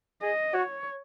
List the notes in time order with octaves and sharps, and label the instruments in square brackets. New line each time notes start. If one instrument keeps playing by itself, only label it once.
[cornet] G#4 [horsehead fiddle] D#5
[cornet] F#4 [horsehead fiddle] C#5